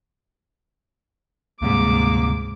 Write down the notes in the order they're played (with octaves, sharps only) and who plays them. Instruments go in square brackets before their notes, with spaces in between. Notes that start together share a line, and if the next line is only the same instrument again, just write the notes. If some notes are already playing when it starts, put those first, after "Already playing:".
[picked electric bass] D2 C3 G3 [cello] G#2 [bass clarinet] A#3 [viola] D6